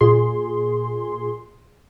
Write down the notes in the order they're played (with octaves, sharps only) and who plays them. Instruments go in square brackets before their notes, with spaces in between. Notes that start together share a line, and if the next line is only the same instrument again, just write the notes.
[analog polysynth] A#2 G#4 C6